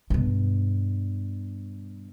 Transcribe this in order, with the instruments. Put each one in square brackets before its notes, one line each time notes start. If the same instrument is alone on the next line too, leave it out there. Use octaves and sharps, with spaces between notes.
[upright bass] G2 B2